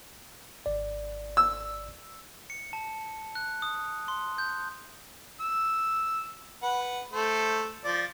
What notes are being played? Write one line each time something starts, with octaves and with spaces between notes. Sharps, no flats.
G#1 D5
E6
C#7
A5
F#6
D#6
C6
G6
E6
B4 F#5
A3 C5
F3 D5